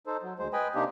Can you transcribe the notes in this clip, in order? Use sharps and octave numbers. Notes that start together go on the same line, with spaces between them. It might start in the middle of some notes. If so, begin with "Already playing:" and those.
D#4 A4 C5
F#3
D2 G#3 C5
B4 D#5 G5 G#5 B5
C3 A#3 C4 D4 D#4 G4